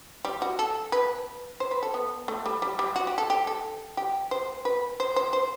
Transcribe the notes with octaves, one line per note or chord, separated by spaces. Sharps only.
G3
F#4
A4
B4
C5
B4
A4
B3
A3
G3
G3
G3
F#4
G4
A4
G4
A4
G4
C5
B4
C5
C5
C5